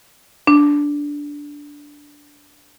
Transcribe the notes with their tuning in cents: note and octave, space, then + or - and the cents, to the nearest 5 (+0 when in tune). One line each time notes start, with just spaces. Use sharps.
D4 -10